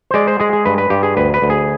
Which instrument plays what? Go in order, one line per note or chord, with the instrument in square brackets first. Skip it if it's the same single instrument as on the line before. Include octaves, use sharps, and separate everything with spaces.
[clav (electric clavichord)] C5
G#3 D5
C5
G#3 G#4
G#4
G2 B4
B4
G2 G4
G#4
D2 B4
B4
D2
G#4